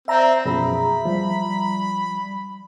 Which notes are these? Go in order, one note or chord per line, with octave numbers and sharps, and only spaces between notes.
C4 D5 E5 A#5
F#2 B2 F3 G#4 B5
F3 G3